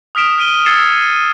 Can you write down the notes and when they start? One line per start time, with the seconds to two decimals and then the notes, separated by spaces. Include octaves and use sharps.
0.15 D#6 F6 B6 D7 E7
0.38 F6 D7 D#7 G7
0.66 E6 G#6 A6 C7 C#7 E7
1.02 D#7